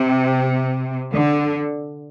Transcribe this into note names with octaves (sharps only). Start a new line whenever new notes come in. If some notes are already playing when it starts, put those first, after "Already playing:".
Already playing: C3
D3